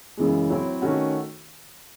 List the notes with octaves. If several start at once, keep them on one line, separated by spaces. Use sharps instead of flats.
F#2 C#3 E3 G#3
A2 F#3 C4 E4
D#3 A3 C#4 F#4